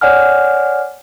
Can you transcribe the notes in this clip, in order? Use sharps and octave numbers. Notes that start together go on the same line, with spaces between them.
C#5 D5 F#5 G#5 F6